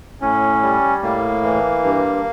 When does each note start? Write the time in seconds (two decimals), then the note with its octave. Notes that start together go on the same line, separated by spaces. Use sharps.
0.21 A2 C#4
0.62 G3
1.03 A2 A#3
1.43 E3
1.84 G2